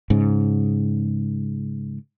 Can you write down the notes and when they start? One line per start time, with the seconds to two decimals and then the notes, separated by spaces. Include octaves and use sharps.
0.10 G#2 C#3